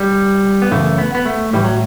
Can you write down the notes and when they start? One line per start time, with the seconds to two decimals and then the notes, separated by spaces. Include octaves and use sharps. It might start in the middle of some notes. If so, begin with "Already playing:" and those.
Already playing: G3
0.62 B3
0.71 F#2 C#3 E3 A3
0.98 B3
1.15 B3
1.26 A3
1.53 A2 E3 G3
1.64 F#3